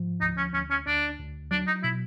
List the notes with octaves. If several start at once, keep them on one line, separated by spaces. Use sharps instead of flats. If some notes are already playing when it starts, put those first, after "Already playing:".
Already playing: G#2 F3
D2 D#4
C#4
D2 C#4
C#4
D2 D4
D2
F#3 D4
D#4
B2 E4